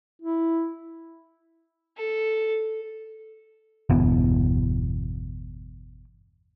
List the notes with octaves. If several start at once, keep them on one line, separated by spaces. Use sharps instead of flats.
E4
A4
G1 E2 B2